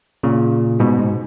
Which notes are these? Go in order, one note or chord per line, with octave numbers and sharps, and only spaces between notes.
A#2 C#3
G#2 B2
G#2